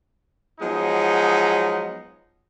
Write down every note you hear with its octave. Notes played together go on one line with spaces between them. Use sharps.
F3 F#3 G#3 B3 D#4